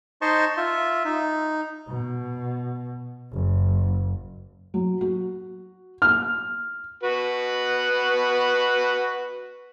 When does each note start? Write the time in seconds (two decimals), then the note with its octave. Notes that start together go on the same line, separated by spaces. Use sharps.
0.22 D#4 C5 D#5 A5 C6 C#6
0.57 F4 E5
1.05 D#4
1.88 B2
3.32 F#1
4.74 F#3
5.01 F#4
6.02 F6
7.04 F#4 B4